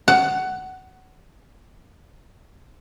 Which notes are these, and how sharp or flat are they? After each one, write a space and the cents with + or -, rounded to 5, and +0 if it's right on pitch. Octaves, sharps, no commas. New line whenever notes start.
F#5 +15